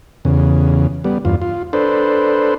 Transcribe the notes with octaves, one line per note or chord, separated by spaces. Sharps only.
E2 C#3
G3 B3
E2 G2 F4
F4
D4 A4 B4 C5